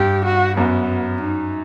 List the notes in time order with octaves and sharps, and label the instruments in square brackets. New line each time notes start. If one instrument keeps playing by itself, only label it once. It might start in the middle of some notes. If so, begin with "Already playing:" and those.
Already playing: [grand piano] G2 [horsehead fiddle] G4
[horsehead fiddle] F#4
[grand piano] F#2 [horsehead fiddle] B3
[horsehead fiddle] D#4